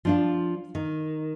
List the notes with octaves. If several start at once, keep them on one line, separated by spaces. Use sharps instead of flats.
F3 D4 F4
D#3